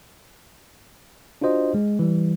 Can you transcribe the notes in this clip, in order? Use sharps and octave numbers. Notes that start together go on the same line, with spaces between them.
D4 F4 F#4 C5 D#5
G#3
E3 G3